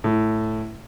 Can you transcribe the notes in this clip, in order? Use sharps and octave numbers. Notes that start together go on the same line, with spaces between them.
A2